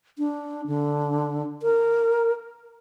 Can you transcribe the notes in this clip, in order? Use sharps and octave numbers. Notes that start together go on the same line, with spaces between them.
D4
D3
A#4